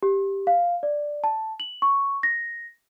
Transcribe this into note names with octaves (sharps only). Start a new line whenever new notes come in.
G4
F5
D5
A5
F#7
C#6
A#6